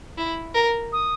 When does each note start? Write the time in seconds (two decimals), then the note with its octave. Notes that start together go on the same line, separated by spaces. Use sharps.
0.17 E4
0.54 A#4
0.93 D#6